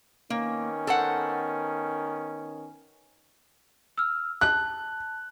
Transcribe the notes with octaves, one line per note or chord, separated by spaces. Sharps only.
D#3 A#3 B3 C#4
A4 C5 F#5
E6 F6
A5 F#6